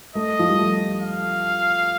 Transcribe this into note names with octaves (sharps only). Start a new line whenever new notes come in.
A3 D#5
F3
G3
A3
F5